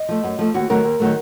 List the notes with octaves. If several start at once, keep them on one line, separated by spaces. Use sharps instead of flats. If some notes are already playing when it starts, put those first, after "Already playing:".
Already playing: D#5
F3 A3
F#2
F3 A3
D#2 F#4
D#3 F#3 A3 A#4
D#2
D#3 F#3 A3